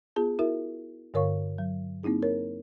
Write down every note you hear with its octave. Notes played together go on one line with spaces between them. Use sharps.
B3 F4 G#4 A5
E4 F#4 A#4 E5
G2 D3 A#4 C#5 F5 C#6
F#3
A#3 C4 D#4 E4 G#4
A#4 C#5